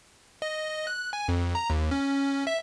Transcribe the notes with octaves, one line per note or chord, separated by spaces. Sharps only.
D#5
F#6
G#5
F2
A#5
D#2
C#4
E5